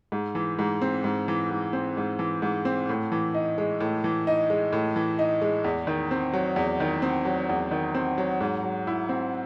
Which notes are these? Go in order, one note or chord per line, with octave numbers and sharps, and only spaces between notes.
G#2
E3
G#2
C4
G#2
E3
G#2
C4
G#2
E3
G#2
C4
A2
E3
D#4
G#3
A2
E3
D#4
G#3
A2
E3
D#4
G#3
E2
D#3
C4
F#3
E2
D#3
C4
F#3
E2
D#3
C4
F#3
G#2
F#3
E4
C4